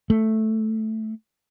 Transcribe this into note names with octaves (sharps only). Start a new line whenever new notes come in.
A3